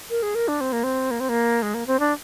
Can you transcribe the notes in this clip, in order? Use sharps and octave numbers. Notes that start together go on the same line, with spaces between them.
A#4
G#4
A#4
D4
C4
A#3
C4
A#3
C4
A#3
G#3
A#3
C4
D4